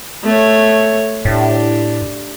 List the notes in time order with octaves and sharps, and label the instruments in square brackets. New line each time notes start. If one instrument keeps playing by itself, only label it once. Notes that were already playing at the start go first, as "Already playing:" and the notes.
[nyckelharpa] A3 C#5
[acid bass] A2 [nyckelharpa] D4 G4